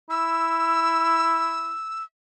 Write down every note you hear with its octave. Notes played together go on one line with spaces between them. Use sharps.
E4 E6